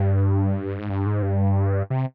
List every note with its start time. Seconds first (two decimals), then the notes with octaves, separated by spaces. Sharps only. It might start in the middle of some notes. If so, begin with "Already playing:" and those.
Already playing: G2
0.79 G#2
0.90 G2
1.06 G#2
1.22 G2
1.90 C3